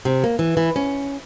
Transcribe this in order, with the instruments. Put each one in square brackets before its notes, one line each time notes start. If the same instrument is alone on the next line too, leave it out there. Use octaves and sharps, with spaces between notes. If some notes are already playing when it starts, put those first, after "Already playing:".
[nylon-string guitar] C3
A#3
E3
E3
C#4